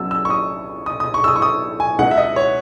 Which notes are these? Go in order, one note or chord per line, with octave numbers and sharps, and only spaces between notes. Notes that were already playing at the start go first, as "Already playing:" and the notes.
Already playing: B1 B2 F#3 C#4 E6
E6
C#6
D#6
D#6
D#6
C#6
E6
D#6
C#6
D#6
G#5
C#2 B2 G#3 D#4 F#5
E5
D#5
C#5